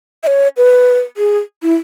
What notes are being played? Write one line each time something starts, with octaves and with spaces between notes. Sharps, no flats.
E5
C#5
B4
G#4
E4